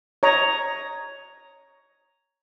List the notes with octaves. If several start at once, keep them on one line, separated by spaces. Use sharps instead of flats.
C#5 D#5 A#5